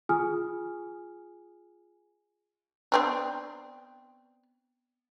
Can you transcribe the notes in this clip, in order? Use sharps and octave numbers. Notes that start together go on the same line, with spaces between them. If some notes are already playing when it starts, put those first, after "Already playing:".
F4 G#4 G#5 D#6 F6
B3 C4 D4